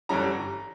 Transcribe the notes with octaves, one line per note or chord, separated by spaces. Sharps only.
G1 G2 E3 G3 C#4 A#5